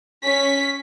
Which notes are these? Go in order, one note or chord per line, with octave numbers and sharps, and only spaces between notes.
C#4 B6